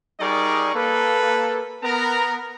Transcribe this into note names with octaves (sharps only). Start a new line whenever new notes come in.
G3 D#4 G#4 A#4 D5 C#6
A#3 A4 B4
B3 A#4 A#5